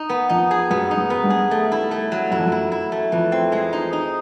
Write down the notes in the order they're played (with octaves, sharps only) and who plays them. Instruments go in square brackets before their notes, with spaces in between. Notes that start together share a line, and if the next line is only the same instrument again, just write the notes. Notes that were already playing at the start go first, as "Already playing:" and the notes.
Already playing: [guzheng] D#4
B3
[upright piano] F2 [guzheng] D#4
[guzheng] G#4
[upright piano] F#2 [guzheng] B3
[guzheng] D#4
[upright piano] F#2
[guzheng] B3
[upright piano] G2
[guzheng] G#4
A3
E4
A3
F#3
[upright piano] F#2 [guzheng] E4
[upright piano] F2
F#2
[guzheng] E4
E4
A3
[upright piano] F2 [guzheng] E3
[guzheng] C4
G#3
D#4
D#4